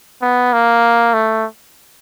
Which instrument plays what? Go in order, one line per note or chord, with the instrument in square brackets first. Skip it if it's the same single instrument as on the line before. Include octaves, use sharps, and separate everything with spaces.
[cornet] B3
A#3
A3